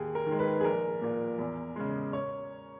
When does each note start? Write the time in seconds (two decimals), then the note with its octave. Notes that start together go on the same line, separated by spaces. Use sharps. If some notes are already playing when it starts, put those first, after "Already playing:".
Already playing: D#2 G#4
0.15 A#4
0.27 D#3
0.32 G#3
0.39 B4
0.61 G#4
0.65 A#1 A#4
1.01 A#2 A#3
1.39 E2
1.76 C#3 G#3
2.13 C#5